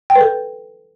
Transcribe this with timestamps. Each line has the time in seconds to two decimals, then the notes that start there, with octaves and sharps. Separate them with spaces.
0.10 G5
0.15 B4
0.21 A4